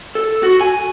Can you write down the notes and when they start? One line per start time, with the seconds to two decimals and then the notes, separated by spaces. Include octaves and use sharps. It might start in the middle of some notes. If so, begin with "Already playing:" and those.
0.15 A4
0.43 F#4
0.61 G#5